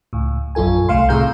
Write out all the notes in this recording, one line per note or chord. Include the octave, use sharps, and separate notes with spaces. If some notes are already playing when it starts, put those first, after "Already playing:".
C#2 A2
A#1 F#2 F4 A4 G#5
C2 A3 F5 C6
A2 C3 G#4 F5 A#5 G6